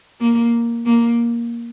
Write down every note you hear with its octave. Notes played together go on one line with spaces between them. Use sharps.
A#3
A#3